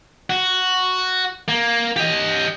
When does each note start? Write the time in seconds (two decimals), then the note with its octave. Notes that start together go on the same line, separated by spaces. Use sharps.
0.30 F#4
1.48 A#3
1.96 G4 D#5